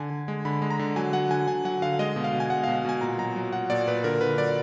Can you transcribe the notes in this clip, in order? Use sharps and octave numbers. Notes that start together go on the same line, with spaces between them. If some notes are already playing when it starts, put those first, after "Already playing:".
Already playing: D3 G#5
D3
G#3
D3 B5
G#3
A#5
D3
F#3 G#5
F#3 F#5
D3 G#5
D3 G#5
F#3 F#5
D3 F5
G#3 D#5
B2
F5
B2
G#5
G#3 F#5
B2 F5
B2 G#5
A#2 A#5
F#3 A#5
F#3
F#3 F#5
A#2 D5
A#2 B4
D3 A#4
D3 B4
F#3 D5